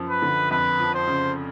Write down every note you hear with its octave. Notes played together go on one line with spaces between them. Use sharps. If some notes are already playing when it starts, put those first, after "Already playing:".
Already playing: F#2 F3
B4
D3
F2 B4
F3
C5
C#3